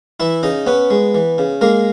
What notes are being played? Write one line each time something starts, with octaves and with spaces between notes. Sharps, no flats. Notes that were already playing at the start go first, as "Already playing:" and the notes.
E3 E4 E5
C#3 D#4 D#5
B3 C#4 B4
G#3
E3
C#3
G#3 A#3 A#4